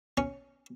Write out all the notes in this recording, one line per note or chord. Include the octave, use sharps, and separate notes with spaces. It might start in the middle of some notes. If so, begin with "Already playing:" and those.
C#4